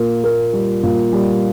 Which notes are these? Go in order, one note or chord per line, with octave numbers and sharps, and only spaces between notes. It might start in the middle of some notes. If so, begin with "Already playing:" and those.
Already playing: A#2 A#3
A#3
G3
A#2
G3